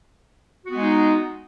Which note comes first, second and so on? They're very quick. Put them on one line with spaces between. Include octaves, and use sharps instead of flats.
F#4 B3 G#3 D#4